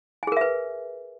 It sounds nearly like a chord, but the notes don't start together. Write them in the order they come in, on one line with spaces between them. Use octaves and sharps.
G#5 G#4 A#4 E5 B4